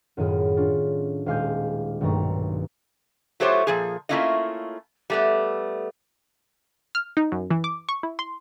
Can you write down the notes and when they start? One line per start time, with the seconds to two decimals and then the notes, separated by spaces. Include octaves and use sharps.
0.17 F#2 A2 D#3 F4 G#4 B5
0.57 C#4 D4 F4
1.26 D#1 G#3 F5 G#5 D6 G6
2.01 B1 G2 D#3 A3 A#5 C#6
3.40 F#3 A3 F4 G4 C5 C#5
3.67 A#2 F3 G#4
4.09 A3 A#3 C#4 E4 F4 D#5
5.10 G3 A3 B3
6.95 F6
7.17 D#4
7.32 F#2
7.51 E3
7.64 D6
7.89 C#6
8.03 E4
8.19 C6